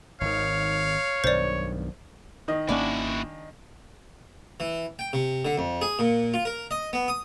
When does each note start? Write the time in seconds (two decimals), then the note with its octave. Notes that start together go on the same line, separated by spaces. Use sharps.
0.21 G#1 D#3 C#5 F5
1.24 B1 G2 D#3 C5 D5
2.48 D#3 D#5
2.69 G#1 A#3 C#4 D4 E4 F#4 F5 G#5
4.60 E3
4.99 G5
5.13 C3
5.45 D3
5.58 F2
5.82 G#4
5.99 A#2
6.34 F4
6.45 A#4
6.71 D#5
6.93 B3
7.08 D#6